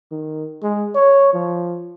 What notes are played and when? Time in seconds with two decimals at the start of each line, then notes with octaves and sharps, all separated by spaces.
0.12 D#3
0.63 G#3
0.95 C#5
1.34 F3